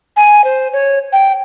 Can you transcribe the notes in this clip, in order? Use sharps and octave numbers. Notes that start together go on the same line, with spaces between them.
G#5
C5
C#5
G5